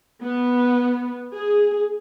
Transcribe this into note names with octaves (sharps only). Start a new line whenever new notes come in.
B3
G#4